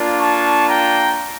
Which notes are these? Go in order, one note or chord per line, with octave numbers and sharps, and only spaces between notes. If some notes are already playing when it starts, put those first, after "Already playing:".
Already playing: A#3 D4 F4
A5 C#6
G5 A#5